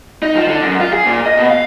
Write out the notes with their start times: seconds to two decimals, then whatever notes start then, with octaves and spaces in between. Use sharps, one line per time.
0.23 D#4
0.35 F3
0.48 D3
0.64 F#2
0.80 F4
0.93 G#4
1.06 A#2
1.26 D#5
1.38 B2
1.50 F5